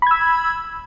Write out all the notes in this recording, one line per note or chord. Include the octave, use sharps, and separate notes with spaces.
B5 E6 G#6